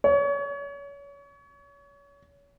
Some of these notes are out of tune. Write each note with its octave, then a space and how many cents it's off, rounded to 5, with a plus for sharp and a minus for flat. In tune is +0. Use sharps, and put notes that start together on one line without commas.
C#5 +30